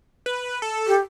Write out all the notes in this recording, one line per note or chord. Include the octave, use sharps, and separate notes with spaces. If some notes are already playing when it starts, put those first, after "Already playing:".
B4
A4
G4